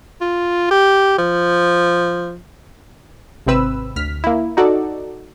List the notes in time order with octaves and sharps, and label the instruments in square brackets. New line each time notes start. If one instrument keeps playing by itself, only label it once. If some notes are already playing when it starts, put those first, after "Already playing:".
[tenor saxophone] F4
G4
F3
[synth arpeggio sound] G#1 C3 C4 B4 E6
D2 F6 B6
A#3 E4
D#4 F#4 A4 D5